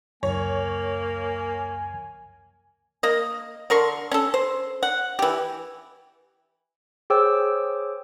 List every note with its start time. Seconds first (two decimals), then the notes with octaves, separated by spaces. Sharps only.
0.23 C#2 F#2 A#3 C#5 G#5
3.03 A#3 D#5
3.70 D3 A#4 C6 C#6
4.11 C#4 A4
4.34 C5
4.83 F#5
5.19 E3 G4
7.10 G#4 C5 C#5 G5 D6 E6